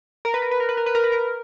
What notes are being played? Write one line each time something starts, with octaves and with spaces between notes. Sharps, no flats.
A#4
B4
A#4
B4
A#4
B4
A#4
B4
A#4
B4
A#4